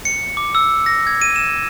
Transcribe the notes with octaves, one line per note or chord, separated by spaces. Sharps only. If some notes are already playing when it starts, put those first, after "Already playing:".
C#7
D6
E6
A#6
G#6
D#7
E7